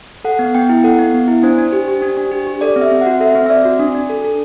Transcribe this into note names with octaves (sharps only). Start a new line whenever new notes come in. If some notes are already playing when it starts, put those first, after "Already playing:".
A4 F#5
B3
B3 G5
E4
A4 F#5
B3
B3
E4
D4 C5
D4
G4
G4
D4
D4
G4
G4
A4 D5
C4
E5
C4
F#4 F#5
A4 E5
C4
E5
C4 D5
F#4
D4
D4
A4
A4